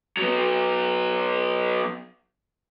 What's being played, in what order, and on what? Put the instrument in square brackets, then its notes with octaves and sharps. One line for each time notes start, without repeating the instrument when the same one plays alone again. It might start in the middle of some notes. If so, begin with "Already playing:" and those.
[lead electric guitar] F#3 B3